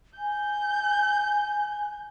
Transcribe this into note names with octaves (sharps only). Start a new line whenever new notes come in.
G#5 G6